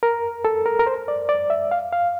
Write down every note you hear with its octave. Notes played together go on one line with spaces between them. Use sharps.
A#4
A4
A#4
A#4
C5
D5
D5
E5
F5
F5